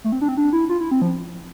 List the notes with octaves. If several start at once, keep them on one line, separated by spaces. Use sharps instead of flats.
A3
C4
D4
C4
D4
E4
F4
E4
C4
F3